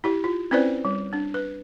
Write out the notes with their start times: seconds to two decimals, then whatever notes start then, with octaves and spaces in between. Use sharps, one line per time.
0.04 E4 G4
0.24 F4
0.51 C4 C#4 E4 B4 C5 D5
0.85 G3
1.13 D4
1.34 B4